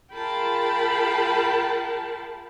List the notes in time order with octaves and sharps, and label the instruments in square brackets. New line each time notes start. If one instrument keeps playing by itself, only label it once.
[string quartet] F4 G#4 A#4 G5 A5 B5